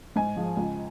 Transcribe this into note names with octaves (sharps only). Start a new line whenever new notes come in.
G#2 G#5
F3 G#3
C#2